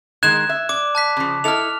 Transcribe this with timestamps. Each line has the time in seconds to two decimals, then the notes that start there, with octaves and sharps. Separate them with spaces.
0.23 D#3 G#3 F#6 G#6 E7
0.49 E5
0.69 D5 D6
0.95 A5 F#6 B6
1.17 C#3 F3
1.44 E4 A4 D#5 F6 F7